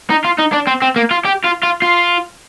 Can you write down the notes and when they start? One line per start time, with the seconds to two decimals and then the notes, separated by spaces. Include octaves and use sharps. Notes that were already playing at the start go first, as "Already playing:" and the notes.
0.10 D#4
0.25 F4
0.39 D#4
0.53 D4
0.67 C4
0.82 C4
0.96 A#3
1.11 F4
1.25 G4
1.44 F4
1.63 F4
1.82 F4